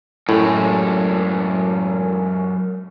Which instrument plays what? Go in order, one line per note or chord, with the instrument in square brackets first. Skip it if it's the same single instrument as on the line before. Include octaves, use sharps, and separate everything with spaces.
[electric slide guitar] F#2 G#3 [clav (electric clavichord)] A2